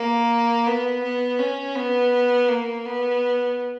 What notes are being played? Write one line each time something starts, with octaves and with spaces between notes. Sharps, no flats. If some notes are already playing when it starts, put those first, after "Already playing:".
Already playing: A#3
B3
B3
C#4
B3
A#3
B3